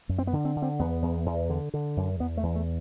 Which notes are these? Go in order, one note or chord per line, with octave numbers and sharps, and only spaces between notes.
F#2
C4
B3
D3
C4
D3
C4
E2 B3
E2
E2
D3
D3
F#2
E2 B3
A3
E2
A3